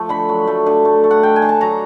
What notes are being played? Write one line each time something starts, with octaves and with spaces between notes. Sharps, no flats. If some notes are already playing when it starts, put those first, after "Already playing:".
Already playing: F3 A3
D3 B5
F#3
A3
D3
A3
A3
F#5
D3 G5
G#5
D3
A5
F#3 A#5